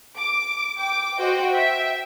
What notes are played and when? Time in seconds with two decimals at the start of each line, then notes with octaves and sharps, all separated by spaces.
0.16 D6
0.77 G5 D6
1.17 F#4 C5 D#5 G5
1.48 E5 G5